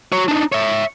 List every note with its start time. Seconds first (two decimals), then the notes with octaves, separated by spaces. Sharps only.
0.12 F#4 C#5
0.28 D4 D#4
0.52 C#5 E5